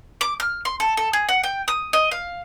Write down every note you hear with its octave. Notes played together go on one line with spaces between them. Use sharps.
D6
F6
C6
A4
A4
G#4
F#5
G5
D#6
D#5
F5